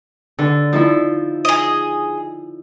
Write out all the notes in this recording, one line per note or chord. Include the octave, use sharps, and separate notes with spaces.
D3
F3 D#4 E4
G#4 D#5